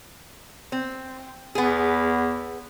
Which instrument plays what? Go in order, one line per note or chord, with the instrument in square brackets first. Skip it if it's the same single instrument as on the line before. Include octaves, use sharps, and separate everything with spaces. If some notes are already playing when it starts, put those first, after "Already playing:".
[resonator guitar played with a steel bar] C4
[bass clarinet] E2 [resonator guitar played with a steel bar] B3 G#4